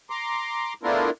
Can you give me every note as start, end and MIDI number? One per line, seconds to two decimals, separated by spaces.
0.10 0.74 82
0.10 0.74 84
0.10 0.74 86
0.83 1.10 57
0.83 1.10 59
0.83 1.10 62
0.83 1.10 64
0.83 1.10 65
0.83 1.10 70